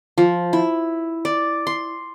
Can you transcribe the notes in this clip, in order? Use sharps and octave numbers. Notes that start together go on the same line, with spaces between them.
F3
E4
D5
C6